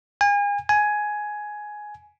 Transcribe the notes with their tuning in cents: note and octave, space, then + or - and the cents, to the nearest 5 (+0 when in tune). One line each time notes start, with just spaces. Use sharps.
G#5 -35
G#5 +10